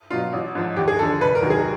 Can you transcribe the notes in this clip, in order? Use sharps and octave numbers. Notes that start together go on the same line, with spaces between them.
B2 F#3 F4
A1
G#2 F3
D#2 G4
G#4
D3 F3 A4
F1 B4
A#4
D#2 D#3 F#3
G#4